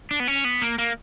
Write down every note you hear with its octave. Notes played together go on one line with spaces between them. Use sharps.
D4
B3
C#4
B3
A#3
A#3